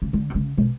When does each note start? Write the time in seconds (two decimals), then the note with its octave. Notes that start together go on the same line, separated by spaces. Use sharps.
0.02 C#3
0.13 D3
0.30 C3
0.35 C#3
0.58 B2